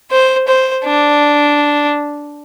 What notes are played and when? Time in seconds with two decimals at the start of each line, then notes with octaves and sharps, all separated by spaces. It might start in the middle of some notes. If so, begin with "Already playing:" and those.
0.11 C5
0.48 C5
0.85 D4